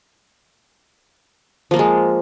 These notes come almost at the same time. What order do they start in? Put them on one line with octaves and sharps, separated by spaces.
F3 A#3 F4 G#3